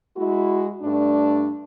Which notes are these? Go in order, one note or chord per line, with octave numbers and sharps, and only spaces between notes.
G#3 E4 F#4
G2 A3 D4